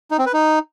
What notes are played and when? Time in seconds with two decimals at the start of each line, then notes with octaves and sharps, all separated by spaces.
0.11 D#4
0.18 C4
0.26 B4
0.33 D#4